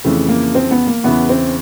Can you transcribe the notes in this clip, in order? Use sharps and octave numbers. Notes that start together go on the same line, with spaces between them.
F2 C#3 E3 A3
A#3
C4
B3
A#3
E2 C#3 E3 B3
C4